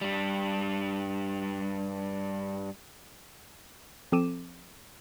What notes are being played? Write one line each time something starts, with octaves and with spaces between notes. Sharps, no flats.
G2 G3
F3 C4 A4 D6 D#7 E7